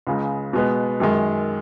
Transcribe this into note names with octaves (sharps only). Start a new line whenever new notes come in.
C#2 C#3 G#3
B2 G#3 B3
F#2 D#3 G#3